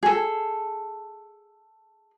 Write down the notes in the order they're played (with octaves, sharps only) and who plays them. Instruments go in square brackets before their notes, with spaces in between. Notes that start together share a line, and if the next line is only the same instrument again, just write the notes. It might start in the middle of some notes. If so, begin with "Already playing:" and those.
[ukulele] G#4 A4